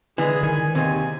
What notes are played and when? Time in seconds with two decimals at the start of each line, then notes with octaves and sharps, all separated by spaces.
0.18 D3 E3 G#3 G#4
0.43 D#3 G#5
0.75 D#2 C3 G#5